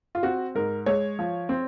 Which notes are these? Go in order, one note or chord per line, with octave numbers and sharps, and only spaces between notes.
F4
C4 F#4
G#2 A#4
G#3 C#5
F3
C4